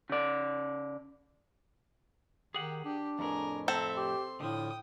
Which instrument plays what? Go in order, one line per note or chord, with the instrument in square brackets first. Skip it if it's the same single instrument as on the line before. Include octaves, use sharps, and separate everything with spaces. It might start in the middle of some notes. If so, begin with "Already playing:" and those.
[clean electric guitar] C#3 D5
[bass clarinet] D#3 [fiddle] G4 [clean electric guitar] G#4 F#5
[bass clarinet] D4 [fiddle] G4
[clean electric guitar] F2 A2 [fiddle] G#4 A#4
[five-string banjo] C4 A4 [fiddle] E5 A#5
[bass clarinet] G4 [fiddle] C6
[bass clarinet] A2 [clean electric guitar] D3 F3 [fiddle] G5 D#6